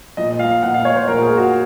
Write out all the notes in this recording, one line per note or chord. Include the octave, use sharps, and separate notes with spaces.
A#2 F3 D#5
F5
A#2 F3 F#5
F5
C#5
C5
A#2 F3 A#4
G#4
F#4